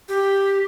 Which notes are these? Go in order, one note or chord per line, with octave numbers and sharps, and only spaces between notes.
G4